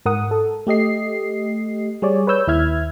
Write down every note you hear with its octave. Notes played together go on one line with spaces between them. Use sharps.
G#2 A#4 F#5 D#6
A4
A3 G4 D#5 C7
G3 G#4 C#5 D5
B4 C#5 E6 G6
D#2 E4 E5 F6 G#6